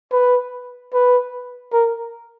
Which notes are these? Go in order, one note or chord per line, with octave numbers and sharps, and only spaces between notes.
B4
B4
A#4